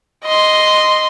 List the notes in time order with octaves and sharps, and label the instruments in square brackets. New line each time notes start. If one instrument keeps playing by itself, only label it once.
[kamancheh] D#5 C6